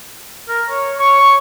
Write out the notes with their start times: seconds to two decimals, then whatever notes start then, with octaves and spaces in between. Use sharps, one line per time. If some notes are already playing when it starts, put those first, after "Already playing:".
0.48 A#4
0.70 C#5
0.98 C#5 C#6
1.21 C#5